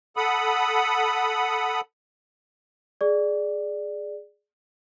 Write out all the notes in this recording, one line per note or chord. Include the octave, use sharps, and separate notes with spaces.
A4 F#5 B5 D#6
G#4 D5